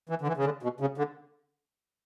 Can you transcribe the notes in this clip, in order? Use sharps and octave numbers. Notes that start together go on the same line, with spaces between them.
E3
D3
E3
C#3
D3
B2
C#3
D3